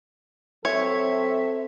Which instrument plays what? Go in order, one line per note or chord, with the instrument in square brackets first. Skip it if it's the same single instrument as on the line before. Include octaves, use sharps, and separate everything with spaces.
[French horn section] F#3 C4 A4 [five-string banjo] C#5 [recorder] E5